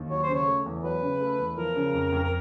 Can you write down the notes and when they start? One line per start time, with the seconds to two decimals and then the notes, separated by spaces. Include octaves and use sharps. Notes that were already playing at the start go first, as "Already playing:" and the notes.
Already playing: D#2
0.10 F#3 C#5
0.23 C5
0.28 C#3
0.35 C#5
0.47 A3
0.66 E2
0.84 F#3 B4
1.02 C#3
1.20 A3
1.39 E2
1.57 F3 A#4
1.76 C#3
1.94 F2
2.12 F2
2.24 A#4